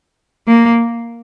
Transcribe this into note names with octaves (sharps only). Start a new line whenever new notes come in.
A#3